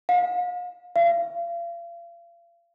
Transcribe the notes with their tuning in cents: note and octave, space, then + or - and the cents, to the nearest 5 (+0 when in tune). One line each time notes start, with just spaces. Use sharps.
F5 +40
F5 -35